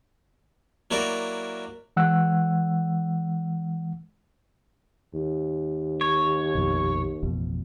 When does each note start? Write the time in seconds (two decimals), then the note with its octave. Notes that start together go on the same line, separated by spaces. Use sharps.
0.91 F#3 A#3 E4 F#4 A#4 D5
1.97 E3 G#3 F#5 E6 F#6
5.15 D#2
6.01 C#5
6.55 A#1 F2 B2
7.23 A1 F2 B2